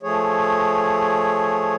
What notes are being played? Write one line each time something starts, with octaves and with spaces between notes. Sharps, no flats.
F3 A3 G#4 C#5